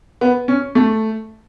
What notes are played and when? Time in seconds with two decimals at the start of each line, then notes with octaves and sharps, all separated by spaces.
0.21 B3
0.48 C#4
0.75 A3